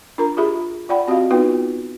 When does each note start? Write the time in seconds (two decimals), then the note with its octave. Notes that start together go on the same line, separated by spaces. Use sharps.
0.18 D4 F4 A#4 A#5
0.37 F4 G4 G#4 E5 B5
0.89 F4 D5 F#5 G5 B5
1.08 C4 F#4 G4 D#5 F5
1.31 B3 D#4 F4 F#4 B4 G5